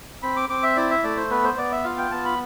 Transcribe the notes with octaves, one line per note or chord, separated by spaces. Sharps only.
C4 B5
D6
C4 D6
E5
E4 D5
E5
A3 D5
C5
B3 B4
C5
B3 D5
E5
F4 F5
G5
B3 A5
B5